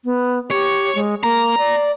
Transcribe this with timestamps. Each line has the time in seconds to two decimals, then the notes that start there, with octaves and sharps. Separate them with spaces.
0.05 B3
0.50 G4 C#5
0.95 G#3
1.23 A#3 A#5
1.58 D5